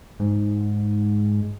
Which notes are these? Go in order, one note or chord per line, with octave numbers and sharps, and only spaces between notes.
G#2